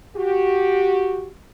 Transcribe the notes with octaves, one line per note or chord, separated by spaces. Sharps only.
F#4 G4